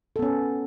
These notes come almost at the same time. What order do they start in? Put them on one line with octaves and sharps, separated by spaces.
A4 B3 C#4